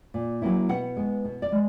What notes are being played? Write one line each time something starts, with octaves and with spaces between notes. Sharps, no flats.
A#2
F#3 A#3 C#4 E4
B2 F#5
G#3 B3
B2
D5
G#3